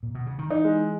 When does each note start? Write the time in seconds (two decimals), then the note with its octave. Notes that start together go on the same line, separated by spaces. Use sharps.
0.03 A#2
0.15 B2
0.26 C#3
0.38 D#3
0.50 E3 D#4
0.64 G#3